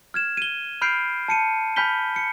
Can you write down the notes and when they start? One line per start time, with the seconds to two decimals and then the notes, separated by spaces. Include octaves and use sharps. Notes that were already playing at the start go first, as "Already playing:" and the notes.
0.14 F6 G#6 E7
0.37 D#7 G7
0.82 B5 F6 G6 C7 D7
1.28 A5 C#7 D#7
1.76 G#5 B5 F6 G6 B6 G7
2.16 C#7